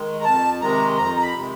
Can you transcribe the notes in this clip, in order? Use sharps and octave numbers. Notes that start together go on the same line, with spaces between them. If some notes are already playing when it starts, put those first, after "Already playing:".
Already playing: D#3 G#3
A#5
F2 A5
C3 D#3 G#3 A#5
F2 A#5
A#5
B5
C3 D#3 G#3